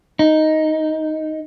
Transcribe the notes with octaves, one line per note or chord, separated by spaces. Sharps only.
D#4